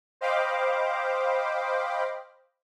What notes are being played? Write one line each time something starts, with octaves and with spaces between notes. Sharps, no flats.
C5 D#5 F5 G5 B5 D6